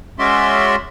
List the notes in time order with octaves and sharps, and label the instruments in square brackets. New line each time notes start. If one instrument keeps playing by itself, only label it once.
[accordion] G#3 C#4 F#4 D5 E5 C6